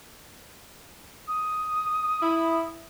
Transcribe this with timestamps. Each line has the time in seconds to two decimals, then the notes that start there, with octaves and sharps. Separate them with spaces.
1.28 D#6
2.22 E4